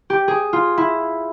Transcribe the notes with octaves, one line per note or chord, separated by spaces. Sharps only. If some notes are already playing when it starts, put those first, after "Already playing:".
G4
G#4
F4
E4